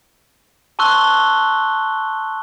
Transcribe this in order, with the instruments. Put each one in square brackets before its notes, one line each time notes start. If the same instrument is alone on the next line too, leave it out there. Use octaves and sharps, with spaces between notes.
[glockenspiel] A5 C6 C#6 E6 F#6 G7